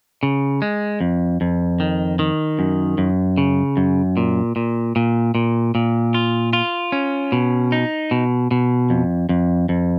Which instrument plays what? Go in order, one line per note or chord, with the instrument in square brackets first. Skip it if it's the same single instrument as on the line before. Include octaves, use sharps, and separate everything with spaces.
[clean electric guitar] C#3
G#3
F2
F2
D#3
D#3
F#2
F#2
C#3
F#2
A#2
A#2
A#2
A#2
A#2
F4
F4
C#4
B2
D#4
B2
B2
F2
F2
F2